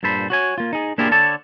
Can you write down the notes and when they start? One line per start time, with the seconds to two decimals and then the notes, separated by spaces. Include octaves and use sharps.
0.03 G2 A#2 A4 C5 B5
0.30 F#4 C#5 G#5
0.58 A#3 F4
0.73 D#4 G#4
0.98 A#3 D4 E4 F4 G4 G#4
1.11 D3 A4 C#5 D5 A5